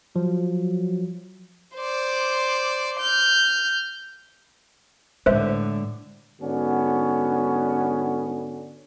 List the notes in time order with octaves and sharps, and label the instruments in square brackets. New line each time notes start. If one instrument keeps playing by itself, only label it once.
[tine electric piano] F3 [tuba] F#3
[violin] C5 D5
F6 G6
[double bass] A2 D3 [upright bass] G#3 [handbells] B4 C5 E5
[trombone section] G#2 D3 B3 C#4 D4 F#4